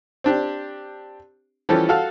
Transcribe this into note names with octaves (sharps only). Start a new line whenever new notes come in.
C4 D4 G4
E3 F3 G3 C#4 G4 A4
F#4 A4 F5